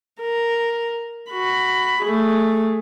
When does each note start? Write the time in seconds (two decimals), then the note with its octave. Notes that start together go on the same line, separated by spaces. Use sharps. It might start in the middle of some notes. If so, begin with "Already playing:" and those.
0.21 A#4
1.31 F#4 B5
2.01 A3 G#4